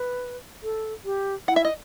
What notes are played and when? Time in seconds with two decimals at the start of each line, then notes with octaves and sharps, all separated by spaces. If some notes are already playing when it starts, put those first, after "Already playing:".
Already playing: B4
0.63 A4
1.05 G4
1.48 E4 F#5
1.56 E5
1.65 D#5